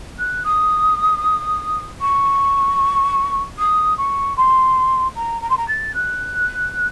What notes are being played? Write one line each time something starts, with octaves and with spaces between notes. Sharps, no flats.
F#6
D#6
C#6
D#6
C#6
C6
A#5
A#5
C6
A#5
A6
F#6